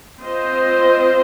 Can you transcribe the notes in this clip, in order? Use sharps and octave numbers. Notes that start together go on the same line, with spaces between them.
C4 F4 C5 D#5